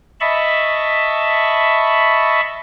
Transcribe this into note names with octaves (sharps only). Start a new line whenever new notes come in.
D#5 E5 A5 B5 C#6